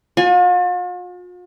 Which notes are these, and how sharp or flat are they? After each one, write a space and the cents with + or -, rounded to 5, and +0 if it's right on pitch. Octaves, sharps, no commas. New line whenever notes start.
F4 +45 G#5 +0